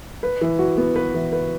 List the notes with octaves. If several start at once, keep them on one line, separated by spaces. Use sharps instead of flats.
B4
E3
F#4
B3
B4
E3
B4